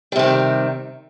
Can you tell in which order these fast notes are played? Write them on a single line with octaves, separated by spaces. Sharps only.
G3 C3 D#3